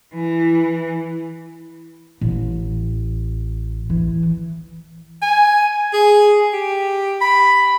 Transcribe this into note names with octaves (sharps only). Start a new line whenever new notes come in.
E3
A1
E3
G#5
G#4
G4
B5